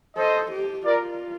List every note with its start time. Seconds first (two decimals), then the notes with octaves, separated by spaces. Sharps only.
0.17 A4 C5 D#5
0.52 G4
0.85 F4 A#4 D5